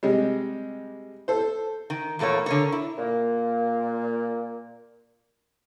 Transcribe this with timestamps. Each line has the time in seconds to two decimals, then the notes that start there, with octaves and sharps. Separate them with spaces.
0.03 C3 G3 G#3
1.28 A4 C5
1.90 D#3
2.19 E2 A#2 A3 A#3 C#5
2.46 D3 A#4 C#5
2.72 E4
2.98 A#2 A#3